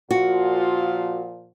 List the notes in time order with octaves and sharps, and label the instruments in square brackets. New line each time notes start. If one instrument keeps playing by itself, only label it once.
[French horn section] A#2 F3 F4 [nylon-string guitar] F#4